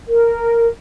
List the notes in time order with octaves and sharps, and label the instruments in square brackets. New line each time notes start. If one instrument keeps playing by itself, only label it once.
[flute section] A#4